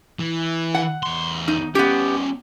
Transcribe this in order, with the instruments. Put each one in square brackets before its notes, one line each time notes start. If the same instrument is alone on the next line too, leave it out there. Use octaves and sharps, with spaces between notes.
[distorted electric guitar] E3
[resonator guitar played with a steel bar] F#5
[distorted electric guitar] E2 C6
[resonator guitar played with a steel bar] D#4
[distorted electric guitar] G3 C#4 [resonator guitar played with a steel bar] B3 G4